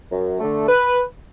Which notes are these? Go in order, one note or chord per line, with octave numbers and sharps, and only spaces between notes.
F#2
D3 A3
B4